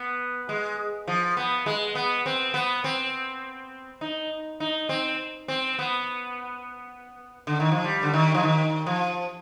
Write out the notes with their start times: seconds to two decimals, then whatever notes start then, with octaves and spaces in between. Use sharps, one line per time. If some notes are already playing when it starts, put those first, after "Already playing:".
Already playing: B3
0.49 G#3
1.07 F3
1.37 B3
1.66 G#3
1.95 B3
2.26 C4
2.54 B3
2.84 C4
4.01 D#4
4.60 D#4
4.89 C4
5.48 C4
5.79 B3
7.47 D3
7.60 D#3
7.72 F3
7.84 G3
8.03 D3
8.13 D#3
8.34 F3
8.43 D#3
8.86 F3